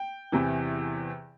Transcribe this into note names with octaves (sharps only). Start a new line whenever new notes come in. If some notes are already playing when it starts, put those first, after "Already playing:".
Already playing: G5
E2 C3 E3